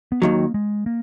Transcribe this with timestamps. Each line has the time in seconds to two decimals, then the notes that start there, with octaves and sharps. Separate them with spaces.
0.12 B3
0.22 D#2 D#3 F#3 A#3
0.54 G#3
0.86 A#3